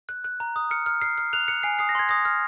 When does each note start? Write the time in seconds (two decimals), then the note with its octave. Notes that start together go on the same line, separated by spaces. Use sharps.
0.09 F#6
0.24 F#6
0.40 A#5
0.56 D#6
0.71 F6 C#7
0.86 F6
1.01 F6 C7
1.18 F6
1.33 F#6 F7
1.48 F#6 C#7
1.63 G#5 C7
1.79 D#6 C7
1.89 A#6
1.95 C6 G#6
2.09 D#6 A#6
2.25 F6